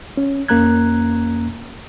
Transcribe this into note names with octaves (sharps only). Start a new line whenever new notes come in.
C#4
F2 A#3 C#4 A#5 F#6 G#6